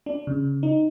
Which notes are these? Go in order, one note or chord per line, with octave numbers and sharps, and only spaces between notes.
D4
C#3
D#4